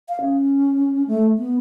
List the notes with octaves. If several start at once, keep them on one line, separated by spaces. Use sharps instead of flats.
F5
C#4
A3
B3